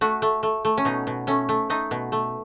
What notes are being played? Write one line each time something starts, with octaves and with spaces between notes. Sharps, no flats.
A3 F#4
A3
A3
A3
C#4
B2 D#4
B2
A3 C#4
A3
A3 D#4
B2
A3